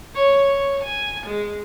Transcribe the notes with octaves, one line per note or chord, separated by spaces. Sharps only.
C#5
C#5
G#5
G#3